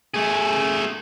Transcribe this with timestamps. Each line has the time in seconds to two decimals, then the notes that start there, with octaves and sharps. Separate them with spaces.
0.14 A3 G#4